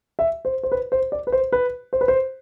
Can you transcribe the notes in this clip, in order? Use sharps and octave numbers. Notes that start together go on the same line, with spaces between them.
E5
C5
C5
B4
C5
D5
B4
C5
B4
C5
B4
C5